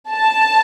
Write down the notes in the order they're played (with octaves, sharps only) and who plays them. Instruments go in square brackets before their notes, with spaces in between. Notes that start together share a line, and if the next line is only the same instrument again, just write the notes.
[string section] A5